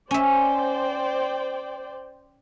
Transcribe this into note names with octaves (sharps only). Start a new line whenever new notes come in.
C#4 C5 D5 E5 G5